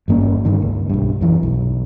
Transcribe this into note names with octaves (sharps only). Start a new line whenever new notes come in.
G#1 G2 A#3 C#4
G1 G2 D3 D#3
C#2
B1 G2
F#2 E3
B1